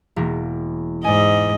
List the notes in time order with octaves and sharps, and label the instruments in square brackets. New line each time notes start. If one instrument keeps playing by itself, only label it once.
[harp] E1 A#3
[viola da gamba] G#2 D#5 [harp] D5 G#5